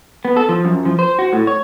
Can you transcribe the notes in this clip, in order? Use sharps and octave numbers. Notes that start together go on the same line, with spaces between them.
B3
A4
F3
F#2
F3
C5
F#4
A2
C#5